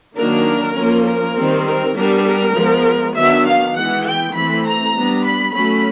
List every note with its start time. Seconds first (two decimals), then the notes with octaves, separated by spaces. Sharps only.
0.16 D#3 F#3 A#3 D4 A#4
0.75 F3 A#3 C#4
1.05 A#4
1.36 D#3 G3 C4
1.65 A#4
1.96 G3 B3 D4 A#4
2.25 A#4
2.55 F3 G#3 B3
3.15 D#3 F#3 B3 D4 E5
3.45 F5
3.75 E3 G#3 B3 F#5
4.06 G5
4.35 E3 A3 C4 B5
4.65 A#5
4.95 G3 B3 D4
5.24 B5
5.55 F#3 A3 C#4 B5